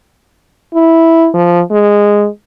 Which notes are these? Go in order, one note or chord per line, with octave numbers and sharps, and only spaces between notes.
E4
F3
G#3